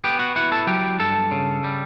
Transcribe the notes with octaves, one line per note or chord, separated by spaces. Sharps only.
B3 G4 G5
F#4 F#5
E4 F#4 F#5
A4 A5
F#3 G4 G5
G2 A4 A5
C#3
G3